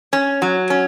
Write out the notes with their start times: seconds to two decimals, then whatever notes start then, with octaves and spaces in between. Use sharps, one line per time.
0.13 C#4
0.42 F#3
0.70 C#4